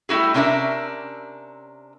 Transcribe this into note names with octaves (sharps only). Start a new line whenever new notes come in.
G3 A3 E4 F#4 G#4
C3 C#4 D4 A#4 E5